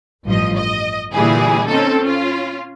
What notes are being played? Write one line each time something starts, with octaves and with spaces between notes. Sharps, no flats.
A1 G2 F3 D#5
D#5
A#2 D3 E3 G3 E4 G#4
C4 C#4 D#4 A4
C#4 F4